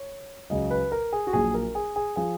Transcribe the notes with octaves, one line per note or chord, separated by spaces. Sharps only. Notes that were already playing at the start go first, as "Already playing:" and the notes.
Already playing: C#5
C#2 C#3 F#3 D#5
B4
A#4
G#4
F#4
A#1 A#2 F#3 G#4
A#4
G#4
G#4
F3 G#4